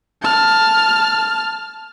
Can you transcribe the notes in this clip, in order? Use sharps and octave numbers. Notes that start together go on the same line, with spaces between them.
A5 F6